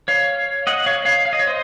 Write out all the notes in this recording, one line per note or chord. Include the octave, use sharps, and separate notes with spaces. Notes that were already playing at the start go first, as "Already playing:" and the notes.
C#5 F5
D#5 F#5
C#5 F5
C#5 F5
F5
D#5
C#5
C5 D#5